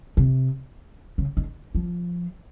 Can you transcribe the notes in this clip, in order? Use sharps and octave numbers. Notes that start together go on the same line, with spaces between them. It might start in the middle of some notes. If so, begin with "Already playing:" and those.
C3
C#3
D#3
F3